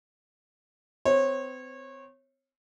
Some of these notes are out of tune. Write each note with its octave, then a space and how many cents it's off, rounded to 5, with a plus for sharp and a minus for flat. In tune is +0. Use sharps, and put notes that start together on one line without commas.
C4 -35 C#5 -30